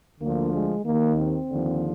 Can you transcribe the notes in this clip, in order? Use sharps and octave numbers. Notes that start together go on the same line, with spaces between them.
D2 D3 F3 A#3
G#3
D#2 D#3 A#3
C4
D#2 D3 F3